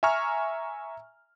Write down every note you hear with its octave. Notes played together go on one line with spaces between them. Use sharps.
E5 G#5 A#5 C#6 F6